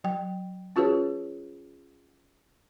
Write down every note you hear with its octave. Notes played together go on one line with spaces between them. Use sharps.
F#3 G5
C#4 F4 F#4 G#4 B4 C#5